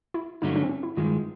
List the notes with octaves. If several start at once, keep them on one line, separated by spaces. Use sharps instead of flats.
E4
G2 D3 F#3 A3 C#4 D#4
D4
C4
C#4
E4
G2 D#3 G#3 F4